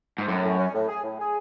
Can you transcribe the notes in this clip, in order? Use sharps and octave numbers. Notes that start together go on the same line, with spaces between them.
G#2
F#2 A2
A2
C#4
A2
G#4
A2
G#4